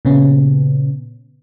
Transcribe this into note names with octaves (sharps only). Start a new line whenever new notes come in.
A#2 C#3 B3 C#4